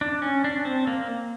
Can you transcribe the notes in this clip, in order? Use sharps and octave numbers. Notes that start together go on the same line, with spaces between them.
D4
C#4
D4
C4
A#3